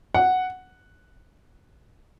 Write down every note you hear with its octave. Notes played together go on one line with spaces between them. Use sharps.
F#5